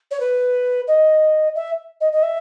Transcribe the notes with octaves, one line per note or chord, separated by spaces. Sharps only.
C#5
B4
D#5
E5
D#5
D#5
E5